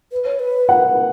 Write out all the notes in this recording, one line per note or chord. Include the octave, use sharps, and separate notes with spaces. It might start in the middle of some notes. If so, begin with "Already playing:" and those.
B4
C#5
B4
F#5